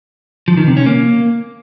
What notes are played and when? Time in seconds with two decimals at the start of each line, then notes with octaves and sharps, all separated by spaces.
0.48 F3
0.57 D#3
0.67 C3
0.77 C#4
0.86 A#3